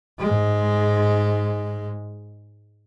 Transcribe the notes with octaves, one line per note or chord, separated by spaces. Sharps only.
G#2 G#3